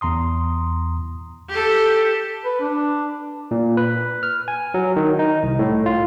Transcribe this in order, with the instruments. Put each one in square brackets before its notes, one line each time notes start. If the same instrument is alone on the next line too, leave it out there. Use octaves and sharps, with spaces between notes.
[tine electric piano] E2 A#5 C6 D#6
[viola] G4 A4
[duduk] B4
D4
[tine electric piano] A#2
B4
F6
G#5
F#3
D#3
D#4
C2
A2
F4